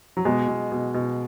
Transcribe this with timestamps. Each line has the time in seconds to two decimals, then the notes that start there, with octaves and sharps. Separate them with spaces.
0.17 F#3
0.25 B2 G#3
0.48 B2
0.72 B2
0.94 B2